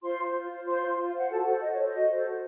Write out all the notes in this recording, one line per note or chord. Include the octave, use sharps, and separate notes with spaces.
F4 C5 C6
C5
F4
C5
F4 C5 C6
C5
F4
F5
C5 F#5
F#4 A4 A5
F#4 A4 C5 F#5
F#4 D#5
C#5
A4 C5 D#5
F#4
A4 C5
F#4